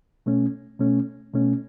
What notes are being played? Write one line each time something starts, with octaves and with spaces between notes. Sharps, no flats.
B2 A3 C#4
B2 A3 C#4
B2 A3 C#4